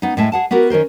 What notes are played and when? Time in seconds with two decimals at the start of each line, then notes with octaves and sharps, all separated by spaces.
0.02 B3 D#4
0.17 A2 G#3 E5 A5
0.32 G#4 F#5 A5
0.51 B3 F#4 G4 A#4
0.70 D#3 C#4 A#4 C5